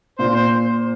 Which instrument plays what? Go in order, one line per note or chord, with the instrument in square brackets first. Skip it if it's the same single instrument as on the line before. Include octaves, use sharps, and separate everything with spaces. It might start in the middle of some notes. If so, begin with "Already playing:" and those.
[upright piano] A#2 [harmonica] C5
[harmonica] C5